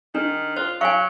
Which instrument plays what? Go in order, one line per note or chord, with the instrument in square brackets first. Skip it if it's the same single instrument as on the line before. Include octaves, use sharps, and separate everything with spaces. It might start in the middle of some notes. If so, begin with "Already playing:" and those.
[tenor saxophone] D#3 [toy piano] D4
[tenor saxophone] F4 [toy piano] C5
[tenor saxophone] F#3 [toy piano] F5 G#5